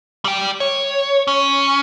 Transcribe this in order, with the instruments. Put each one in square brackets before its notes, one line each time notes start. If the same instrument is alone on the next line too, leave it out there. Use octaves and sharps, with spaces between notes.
[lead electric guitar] G3 G5
C#5
C#4